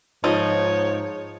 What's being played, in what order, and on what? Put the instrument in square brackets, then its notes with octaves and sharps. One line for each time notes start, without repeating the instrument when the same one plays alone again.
[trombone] G#2 [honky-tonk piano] F3 [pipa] D#4 [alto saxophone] C#5